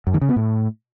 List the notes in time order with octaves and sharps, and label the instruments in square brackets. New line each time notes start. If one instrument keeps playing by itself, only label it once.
[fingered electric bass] F#2
D#3
C#3
B3
A2